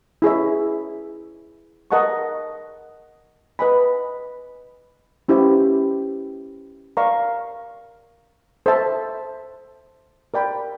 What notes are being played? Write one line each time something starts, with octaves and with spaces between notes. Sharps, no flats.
E4 G#4 C#5 E5
A#4 D#5 F#5 A5 C#6
B4 D#5 G#5 B5
C#4 E4 G4 C5 E5
A#4 D5 F5 A#5 C#6
A4 C5 E5 A5
A#4 D5 G5 B5